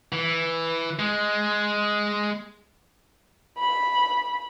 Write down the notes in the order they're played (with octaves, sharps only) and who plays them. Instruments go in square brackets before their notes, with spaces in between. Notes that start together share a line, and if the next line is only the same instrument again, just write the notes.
[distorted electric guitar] E3
G#3
[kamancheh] B5